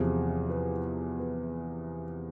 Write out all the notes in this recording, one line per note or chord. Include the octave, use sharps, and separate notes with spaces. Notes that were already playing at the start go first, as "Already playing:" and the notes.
Already playing: E2 C3 F3 G#4
B4
B4